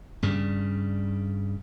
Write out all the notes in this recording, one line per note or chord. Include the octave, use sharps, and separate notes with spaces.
G2 C#3 G3